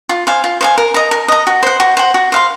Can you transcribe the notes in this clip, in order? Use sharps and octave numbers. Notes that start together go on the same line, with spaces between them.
F4
C5 F5 G#5
F4
C5 F5 G#5
A#4
D#5 A#5
A#4
D#5 A#5
F#4
C5 F#5
F#4
C5 F#5
F#4
C5 F5 C6